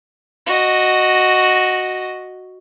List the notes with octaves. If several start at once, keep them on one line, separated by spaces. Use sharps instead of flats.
F#4 D#5